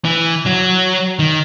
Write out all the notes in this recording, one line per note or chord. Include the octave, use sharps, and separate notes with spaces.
E3
F#3
D#3